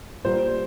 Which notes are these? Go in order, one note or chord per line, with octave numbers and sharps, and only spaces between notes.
A#2 G3 A#3 C5